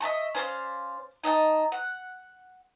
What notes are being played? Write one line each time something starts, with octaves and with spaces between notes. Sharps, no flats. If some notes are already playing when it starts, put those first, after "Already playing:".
D#5 E5 A5 C#6
C#4 C5 D5 F5
D#4 D#5 G5 A5
F#5